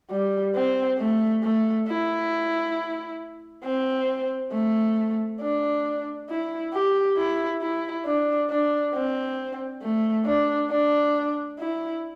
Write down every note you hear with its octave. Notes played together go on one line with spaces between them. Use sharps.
G3
C4
A3
A3
E4
C4
A3
D4
E4
G4
E4
E4
D4
D4
C4
A3
D4
D4
E4